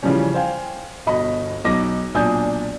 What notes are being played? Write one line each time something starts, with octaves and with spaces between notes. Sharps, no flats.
C#3 E3 F3 G3 C#4
C5 F5 G5 G#5
G1 B2 D#5 B5
B1 D#4 D6 A#6
B1 A#2 D4 G#5 D#6 G6